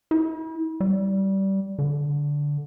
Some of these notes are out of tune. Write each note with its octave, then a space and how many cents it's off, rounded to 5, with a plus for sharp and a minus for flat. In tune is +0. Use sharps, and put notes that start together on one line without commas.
E4 -40
G3 -20
D3 -10